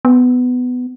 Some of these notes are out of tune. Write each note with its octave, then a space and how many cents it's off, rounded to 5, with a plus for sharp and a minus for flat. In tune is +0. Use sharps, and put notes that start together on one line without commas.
B3 +15